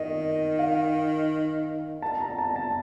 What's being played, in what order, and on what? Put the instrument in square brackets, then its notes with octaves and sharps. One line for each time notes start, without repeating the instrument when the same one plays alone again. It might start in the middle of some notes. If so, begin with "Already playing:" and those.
Already playing: [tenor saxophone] D#3 [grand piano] D#5
[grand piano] F5
A5
A#5
A5
A5